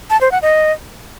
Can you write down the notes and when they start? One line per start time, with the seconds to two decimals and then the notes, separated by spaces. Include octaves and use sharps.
0.10 A5
0.21 C5
0.32 F#5
0.42 D#5